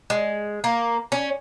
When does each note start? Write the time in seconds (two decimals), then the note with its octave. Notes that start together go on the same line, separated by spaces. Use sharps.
0.10 G#3
0.64 A#3
1.12 C#4